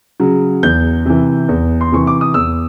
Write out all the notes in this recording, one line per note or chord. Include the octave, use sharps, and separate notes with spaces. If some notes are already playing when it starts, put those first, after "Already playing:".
C#3 F#3
E2 G6
C3 E3
E2
C6
C3 E3 C#6
D6
D#6
E2 E6